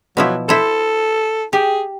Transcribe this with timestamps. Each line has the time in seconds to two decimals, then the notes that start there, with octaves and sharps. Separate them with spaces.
0.17 B2 F3 F#3 E4
0.49 E4 A4 C5
1.53 G4 G#4